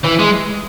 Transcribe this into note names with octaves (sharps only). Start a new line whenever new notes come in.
E3
G#3